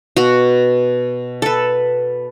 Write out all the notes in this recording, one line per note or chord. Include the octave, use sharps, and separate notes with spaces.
B2 F#4
A4 B4